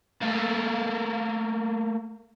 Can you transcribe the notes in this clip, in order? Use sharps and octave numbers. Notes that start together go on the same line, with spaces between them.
A3 A#3